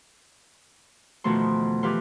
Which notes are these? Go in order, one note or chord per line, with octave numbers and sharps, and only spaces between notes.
E2 B2 D#3 F3 A3 C6
E3 F3 G4 B4 F5 C6